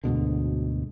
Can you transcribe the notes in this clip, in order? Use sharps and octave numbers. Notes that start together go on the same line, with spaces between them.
D2 G#2 B2 D3